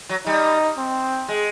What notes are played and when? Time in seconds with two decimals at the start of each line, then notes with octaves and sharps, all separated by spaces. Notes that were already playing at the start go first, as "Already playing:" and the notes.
0.09 F#3
0.26 G3 D#4
0.78 C4
1.28 G#3